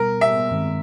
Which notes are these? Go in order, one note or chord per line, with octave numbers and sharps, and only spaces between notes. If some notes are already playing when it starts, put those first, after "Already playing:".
Already playing: B2 G3 B3 A#4
E5
G2 D#3 G#3 C4